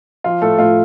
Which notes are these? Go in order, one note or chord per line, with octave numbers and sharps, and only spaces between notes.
F3 F4
A2 A3 A4
A2 F4